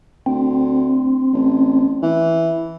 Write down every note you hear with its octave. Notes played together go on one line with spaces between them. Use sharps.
D2 C4
A1
E3